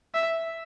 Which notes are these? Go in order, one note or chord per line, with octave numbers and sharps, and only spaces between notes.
E5